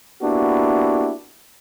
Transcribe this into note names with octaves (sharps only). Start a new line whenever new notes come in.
A#3 B3 D4 E4 F#4 G4